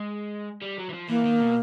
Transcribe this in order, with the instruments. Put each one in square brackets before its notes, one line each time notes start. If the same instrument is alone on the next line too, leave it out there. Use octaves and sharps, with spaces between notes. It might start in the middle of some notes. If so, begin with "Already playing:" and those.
Already playing: [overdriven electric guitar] G#3
G3
F#3
E3
F3
[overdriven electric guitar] E3 [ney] A#3
[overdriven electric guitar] D#3
B2